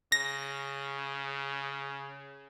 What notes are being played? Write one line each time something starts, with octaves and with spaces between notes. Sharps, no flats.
C#3 A#6